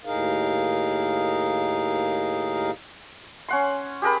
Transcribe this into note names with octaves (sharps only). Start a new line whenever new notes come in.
D#2 A2 D#4 G#4 A#4 F5
C#4 F#5 C6
G4 G#4 A#4 B5